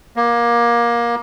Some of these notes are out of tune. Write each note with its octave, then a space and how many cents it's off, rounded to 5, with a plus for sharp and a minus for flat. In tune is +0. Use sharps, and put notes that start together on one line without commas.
A#3 +20